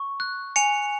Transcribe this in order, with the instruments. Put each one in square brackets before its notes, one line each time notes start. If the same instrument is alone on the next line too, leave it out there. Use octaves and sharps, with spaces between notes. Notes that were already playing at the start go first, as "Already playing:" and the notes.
Already playing: [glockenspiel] C#6
F#6
G#5 C#7 F7